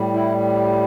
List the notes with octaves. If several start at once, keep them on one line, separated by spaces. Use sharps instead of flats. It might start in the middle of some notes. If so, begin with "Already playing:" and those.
Already playing: A2 G3
E4